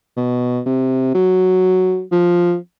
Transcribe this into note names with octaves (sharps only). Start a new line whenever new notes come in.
B2
C3
F#3
F3